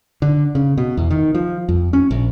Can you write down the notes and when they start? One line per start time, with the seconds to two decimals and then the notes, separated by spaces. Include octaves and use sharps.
0.22 D3
0.55 C#3
0.77 B2
0.97 E2
1.11 D#3
1.34 F3
1.69 F2
1.93 C#4
2.11 A#1